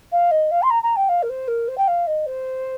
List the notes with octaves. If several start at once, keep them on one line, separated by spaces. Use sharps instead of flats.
F5
D#5
F5
C6
A#5
A#5
G5
F5
A#4
C5
A#4
C5
G5
F5
D#5
C5